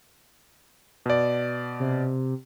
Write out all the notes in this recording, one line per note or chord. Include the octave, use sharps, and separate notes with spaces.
B2 D5
C3